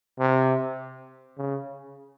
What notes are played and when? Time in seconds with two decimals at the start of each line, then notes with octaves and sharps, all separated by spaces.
0.20 C3
1.38 C#3